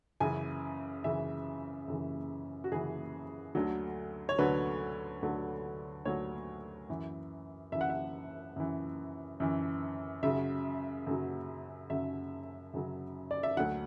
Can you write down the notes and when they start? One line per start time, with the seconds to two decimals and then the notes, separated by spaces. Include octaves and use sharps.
0.20 F#2 C#3 E3 G#5
1.04 F#2 C#3 E3 E5
1.88 F#2 C#3 E3
2.64 F#4
2.72 F#2 C#3 E3 G#4
3.55 D2 D3 F#3
4.29 C#5
4.39 D2 D3 F#3 B4
5.22 D2 D3 F#3
6.05 D2 D3 F#3 C#5
6.89 F#2 E3
7.72 F#2 E3 E5
7.81 F#5
7.90 E5
8.56 F#2 E3
9.40 F#2 E3
10.23 F#2 C#3 F#3 E5
11.07 F#2 C#3 F#3
11.90 F#2 C#3 F#3 E5
12.74 F#2 C#3 F#3
13.31 D5
13.43 E5
13.57 D2 D3 F#3 F#5